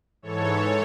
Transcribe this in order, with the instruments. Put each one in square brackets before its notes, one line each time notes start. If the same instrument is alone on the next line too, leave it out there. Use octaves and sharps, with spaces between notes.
[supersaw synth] G#2 E3 A4 C#5